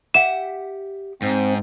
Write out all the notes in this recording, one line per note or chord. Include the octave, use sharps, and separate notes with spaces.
G4 E5 F#5 E7
G#2 C4 C5